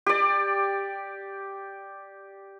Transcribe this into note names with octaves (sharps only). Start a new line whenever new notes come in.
G4 D5